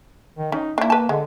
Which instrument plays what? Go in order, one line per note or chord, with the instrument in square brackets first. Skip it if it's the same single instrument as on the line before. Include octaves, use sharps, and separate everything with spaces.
[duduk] D#3
[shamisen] C#4 [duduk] D#4
[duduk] A#3 [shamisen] D4 E4
[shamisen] B4 A5
[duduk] D3 [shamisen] G#3